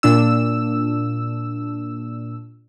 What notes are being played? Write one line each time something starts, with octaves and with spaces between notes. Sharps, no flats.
A#2 D4 E6